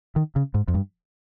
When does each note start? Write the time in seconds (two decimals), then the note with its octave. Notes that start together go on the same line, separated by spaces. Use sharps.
0.16 D#3
0.36 C#3
0.54 G#2
0.68 F2
0.74 G2